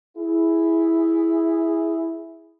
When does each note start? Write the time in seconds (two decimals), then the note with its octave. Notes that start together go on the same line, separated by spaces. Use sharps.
0.18 E4 G#4